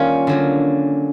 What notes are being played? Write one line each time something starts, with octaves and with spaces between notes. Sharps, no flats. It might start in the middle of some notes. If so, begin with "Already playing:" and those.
Already playing: D#3 G3 A#3 C#4 F4
D3 F#3 A#3